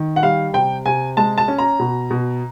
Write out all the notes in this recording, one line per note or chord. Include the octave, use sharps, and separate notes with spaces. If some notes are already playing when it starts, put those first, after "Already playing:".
Already playing: D#3
F#5
G3 F5
C3 G5
C3 G#5
G#3 A5
A5
C#4
A#5
B2
B2